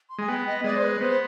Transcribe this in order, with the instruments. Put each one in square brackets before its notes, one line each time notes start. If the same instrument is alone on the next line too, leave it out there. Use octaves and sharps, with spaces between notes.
[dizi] C6
[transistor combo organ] G#3 [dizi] G#5
[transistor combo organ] B3 [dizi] G5
[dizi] D#5
[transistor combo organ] G#3 [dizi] D5
[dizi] C5
B4
[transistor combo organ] B3 [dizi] C5